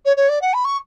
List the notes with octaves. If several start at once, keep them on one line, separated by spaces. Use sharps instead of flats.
C#5
C#5
D5
F#5
B5
C#6